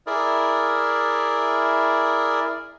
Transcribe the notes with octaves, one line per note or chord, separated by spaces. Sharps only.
E4 G#4 A#4 D5